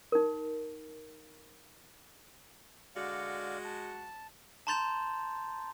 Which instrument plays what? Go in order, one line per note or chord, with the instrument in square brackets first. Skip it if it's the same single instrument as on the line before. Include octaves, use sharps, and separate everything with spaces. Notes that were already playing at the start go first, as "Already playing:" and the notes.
[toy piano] D#4 A#4
[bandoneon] D3 D5 F5 [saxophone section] G#3 F#4
[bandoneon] A5
[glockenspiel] A5 A#5 C6 G6 A6 F7